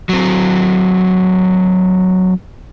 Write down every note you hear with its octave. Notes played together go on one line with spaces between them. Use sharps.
F#3 C4